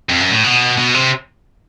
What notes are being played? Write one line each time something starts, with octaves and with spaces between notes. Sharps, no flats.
F2
F#2
A2
B2
B2
C3